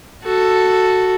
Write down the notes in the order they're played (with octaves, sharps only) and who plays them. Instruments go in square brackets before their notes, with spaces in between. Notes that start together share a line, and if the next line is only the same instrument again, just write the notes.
[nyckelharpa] F#4 A4